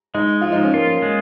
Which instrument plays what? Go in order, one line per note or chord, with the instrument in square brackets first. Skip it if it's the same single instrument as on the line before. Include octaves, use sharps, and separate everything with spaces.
[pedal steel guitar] G#3 [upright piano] D#4
[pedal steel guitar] F3 [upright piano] F4
[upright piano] D#4
C#4
[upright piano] A#3 [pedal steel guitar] F4
[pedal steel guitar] G#3